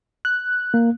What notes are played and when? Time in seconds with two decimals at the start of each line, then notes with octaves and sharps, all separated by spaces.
0.25 F#6
0.74 A#3